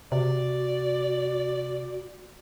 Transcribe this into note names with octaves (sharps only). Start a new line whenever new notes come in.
C3 F#4 D5